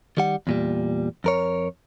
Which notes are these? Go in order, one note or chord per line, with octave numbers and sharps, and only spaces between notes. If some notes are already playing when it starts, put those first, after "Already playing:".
D#3 G3 F#5
E2 A#2 G3
F2 A#4 C#5